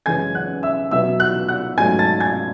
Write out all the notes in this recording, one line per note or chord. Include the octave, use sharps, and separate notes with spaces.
F#2 C#3 E3 G#3 C#4 G#5 G#6
F#5 F#6
E5 E6
B2 F#3 B3 E5 E6
F#5 F#6
F#5 F#6
G#2 F#3 A3 C#4 G#5 G#6
A5 A6
G#5 G#6